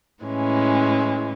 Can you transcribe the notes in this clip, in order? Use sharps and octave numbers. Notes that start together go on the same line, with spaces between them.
A2 E3 G#3 C#4